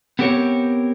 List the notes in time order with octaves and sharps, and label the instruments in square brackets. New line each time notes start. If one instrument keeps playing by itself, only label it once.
[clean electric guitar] B3 C4 G4 A#4 C#5